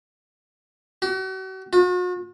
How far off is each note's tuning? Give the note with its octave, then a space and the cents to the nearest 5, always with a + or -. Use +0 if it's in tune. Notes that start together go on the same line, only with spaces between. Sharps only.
F#4 +40
F#4 -45